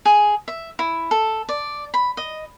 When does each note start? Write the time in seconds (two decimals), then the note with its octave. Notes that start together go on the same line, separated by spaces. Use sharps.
0.05 G#4
0.48 E5
0.79 E4
1.11 A4
1.49 D5
1.94 B5
2.17 D#5